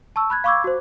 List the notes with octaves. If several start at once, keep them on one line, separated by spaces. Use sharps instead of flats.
A5 C#6 E6
B5 F#6 G#6
F5 B5 C#6 D6 E6 G#6
F#4 C5